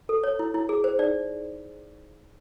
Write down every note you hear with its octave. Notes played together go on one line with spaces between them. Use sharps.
A4
C#5
E4
E4
G#4
C5
D#4 D5